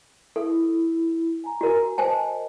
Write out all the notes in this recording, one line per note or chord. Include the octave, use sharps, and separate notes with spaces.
E4 A4
G#5 A#5
F#4 A#4
A#4 C5 D#5 G#5 A5